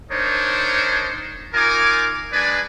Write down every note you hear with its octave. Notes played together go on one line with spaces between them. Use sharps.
D4 D#4 A#4 C5 C#5
D#4 F4 A#4 G#5 D6
G#3 D4 B4 D5 G#5